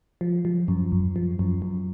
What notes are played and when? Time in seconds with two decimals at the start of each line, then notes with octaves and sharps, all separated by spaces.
0.21 F3
0.45 F3
0.68 F#2
0.92 F#2
1.16 F3
1.39 F#2
1.62 F#2